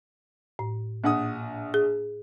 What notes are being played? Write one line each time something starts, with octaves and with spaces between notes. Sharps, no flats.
A2
A#1 F#5 D#6
G#4